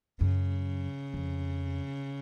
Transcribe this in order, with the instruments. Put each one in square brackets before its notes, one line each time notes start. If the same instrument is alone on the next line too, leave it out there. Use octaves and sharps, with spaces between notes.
[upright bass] F#2 [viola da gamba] C#3
[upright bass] F2